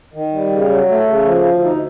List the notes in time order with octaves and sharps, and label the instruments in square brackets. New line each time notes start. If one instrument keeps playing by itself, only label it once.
[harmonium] D#3
G3
C#3
F#3
A3
C#3
F3
D2
D#4